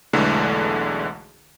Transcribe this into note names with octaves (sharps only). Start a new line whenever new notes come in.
B1 E2 D3 E3 G#3 A3